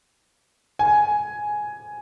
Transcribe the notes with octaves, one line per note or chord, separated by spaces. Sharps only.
G#5